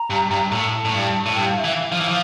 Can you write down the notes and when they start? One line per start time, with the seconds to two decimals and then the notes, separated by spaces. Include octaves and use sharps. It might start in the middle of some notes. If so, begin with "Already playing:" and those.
Already playing: A#5
0.10 G2
0.31 G2
0.42 A#5
0.52 A2 A5
0.85 A2
0.94 G2
1.26 A2
1.36 G2 G5
1.47 F5
1.58 E5
1.64 E3
1.69 F5
1.92 F3
2.00 E3
2.08 F3